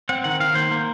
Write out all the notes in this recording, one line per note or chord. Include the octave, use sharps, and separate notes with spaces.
C4 F#5
D#3 F#5
D#3 F5
A#3 C5
A#3